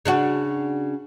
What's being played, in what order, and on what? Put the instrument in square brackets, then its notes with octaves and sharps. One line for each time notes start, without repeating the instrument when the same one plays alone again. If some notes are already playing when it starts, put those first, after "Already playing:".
[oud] C#3 D4 F#4